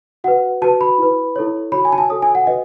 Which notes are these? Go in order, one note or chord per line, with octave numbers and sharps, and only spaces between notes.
F#4 B4 F#5
F#4 B4 A5
B5
E4 B4
E4 A4 C#5
F#4 C#5 B5
G#5
A5
G#5
F#4 A4 C#5 D#6
G#5
F#5
F#4 B4 D#5